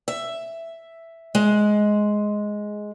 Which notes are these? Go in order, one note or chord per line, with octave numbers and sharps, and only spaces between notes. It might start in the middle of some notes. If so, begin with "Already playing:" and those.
E5
G#3